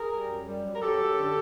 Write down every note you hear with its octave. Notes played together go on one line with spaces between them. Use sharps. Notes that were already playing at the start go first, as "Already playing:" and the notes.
Already playing: G#4 A#4
G3
F#2
G3
F#2
A#4
F#2 G4 A4
F#2
D3